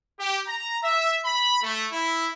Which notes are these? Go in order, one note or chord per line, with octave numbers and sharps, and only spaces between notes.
G4
A#5
E5
B5
A3
E4